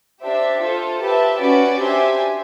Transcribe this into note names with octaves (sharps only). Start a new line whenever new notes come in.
D4 G4 C5 E5
F4 A4 C5
G4 B4 E5 A5
C#4 F#4 B4 D5
D4 G4 C5 E5 G#5